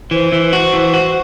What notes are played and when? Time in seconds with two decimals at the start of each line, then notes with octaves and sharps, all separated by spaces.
0.11 E3 C5
0.32 E3
0.53 F#4
0.73 E3
0.94 F#4